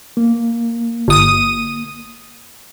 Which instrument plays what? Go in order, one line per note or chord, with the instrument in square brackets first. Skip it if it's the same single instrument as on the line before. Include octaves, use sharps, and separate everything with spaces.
[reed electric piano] A#3
[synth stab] G1 D#6 D#7